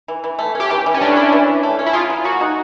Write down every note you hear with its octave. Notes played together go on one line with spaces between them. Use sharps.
E3
E3
A3
C#4 G4
E3 G4
E3
C#4
A3 D4
C#4 E4
E3
E3
A3
C#4
E4
F4 G#4
F#3
A#3 F#4
D#4